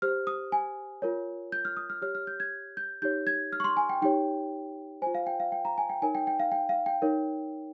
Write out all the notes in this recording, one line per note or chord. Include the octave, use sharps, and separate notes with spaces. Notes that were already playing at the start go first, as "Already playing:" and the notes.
G4 C5 F6
D#6
G#5
F4 A#4 C#5
G6
F6
D#6
F6
G4 C#5 F6
F6
G6
G#6
G6
D#4 G4 C#5 G6
G#6
F6
C#6
C6
G#5
G5
D#4 G4 C#5 G5
F4 C5 G#5
F5
G5
F5
G5
A#5
G#5
G5
D#4 A#4 C#5 G#5
G5
G5
F5
G5
F5
G5
D#4 A#4 C#5